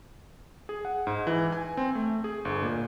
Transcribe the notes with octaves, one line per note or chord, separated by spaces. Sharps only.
G#4
F#5
G#2
E3
G#5
C4
A3
G#4
G1
A#2